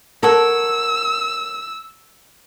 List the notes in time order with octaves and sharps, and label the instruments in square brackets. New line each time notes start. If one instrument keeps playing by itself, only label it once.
[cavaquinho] A4 C#5 F#5 [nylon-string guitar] A#4 [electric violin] E6